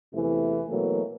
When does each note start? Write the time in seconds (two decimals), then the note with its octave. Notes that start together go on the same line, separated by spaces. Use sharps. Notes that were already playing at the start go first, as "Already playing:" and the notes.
0.13 E2 C3 E3 A3 E4
0.68 B2 E3 F#3 A3 A#3